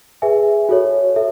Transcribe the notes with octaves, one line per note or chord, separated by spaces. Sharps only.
G#4 B4 E5 G#5
F#4 A4 C#5
A4 E5